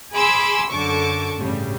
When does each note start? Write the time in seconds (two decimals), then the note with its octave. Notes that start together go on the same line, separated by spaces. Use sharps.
0.13 G#4 G#5 B5 C6 D6 E6
0.71 F#2 D3 A5 C#6 D6
1.37 A1 G2 C#3 G3